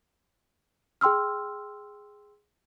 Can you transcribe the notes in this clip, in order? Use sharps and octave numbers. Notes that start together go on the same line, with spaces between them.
G#4 G5 C6 E6 F6